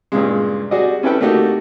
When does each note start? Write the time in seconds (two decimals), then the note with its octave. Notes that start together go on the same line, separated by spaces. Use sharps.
0.12 G2 A#2 C#3 G#3
0.71 G3 F#4 G#4 D5 D#5
1.03 C#4 E4 A4 B4 G5
1.21 A3 A#3 D#4 F#4 G4